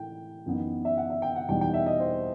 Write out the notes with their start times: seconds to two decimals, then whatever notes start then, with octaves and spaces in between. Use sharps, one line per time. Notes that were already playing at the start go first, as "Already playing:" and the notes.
Already playing: A2 E3 A3 G5
0.46 F#2 E3 B3 D#4
0.85 E5
0.97 F#5
1.10 E5
1.22 G5
1.36 F#5
1.49 E2 B2 G3 D#4 G5
1.61 G5
1.74 E5
1.86 D#5
2.00 C5